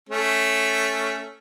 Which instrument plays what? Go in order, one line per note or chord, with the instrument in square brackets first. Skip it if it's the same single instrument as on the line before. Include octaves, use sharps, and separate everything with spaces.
[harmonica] A3 C#4